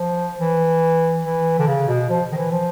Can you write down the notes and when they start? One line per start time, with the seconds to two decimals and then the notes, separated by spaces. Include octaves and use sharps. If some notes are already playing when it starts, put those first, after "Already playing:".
Already playing: F3
0.39 E3
1.24 E3
1.59 D3
1.67 C#3
1.88 B2
2.09 F3
2.32 D#3
2.37 E3
2.51 F3